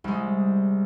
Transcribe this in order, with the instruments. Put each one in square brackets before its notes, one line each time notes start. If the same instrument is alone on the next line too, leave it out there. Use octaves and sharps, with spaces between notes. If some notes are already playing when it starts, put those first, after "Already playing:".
[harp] C2 G#3